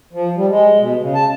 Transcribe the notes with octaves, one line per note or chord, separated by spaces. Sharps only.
F3
G3
G#3
B2
C#3
A5